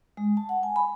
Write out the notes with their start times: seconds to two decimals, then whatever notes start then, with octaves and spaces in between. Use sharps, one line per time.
0.17 G#3
0.37 A5
0.49 F#5
0.63 G#5
0.76 B5